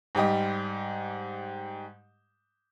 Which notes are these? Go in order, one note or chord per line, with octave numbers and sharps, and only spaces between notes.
G#2 G3 G4 D#5